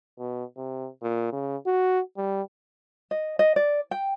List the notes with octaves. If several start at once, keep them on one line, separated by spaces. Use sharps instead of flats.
B2
C3
A#2
C#3
F#4
G3
D#5
D#5
D5
G5